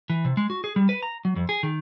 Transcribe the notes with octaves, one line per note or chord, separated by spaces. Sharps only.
E3
C3
G#3
F#4
G#4
G3
B4
A#5
F#3
F2
G#4
D#3